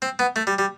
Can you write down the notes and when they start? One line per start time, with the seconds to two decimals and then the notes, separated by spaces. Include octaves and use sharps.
0.02 C4
0.19 B3
0.36 A3
0.47 G3
0.58 G3